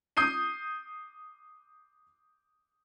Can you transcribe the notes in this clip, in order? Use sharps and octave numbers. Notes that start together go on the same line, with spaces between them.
D#6 G6 C7 D#7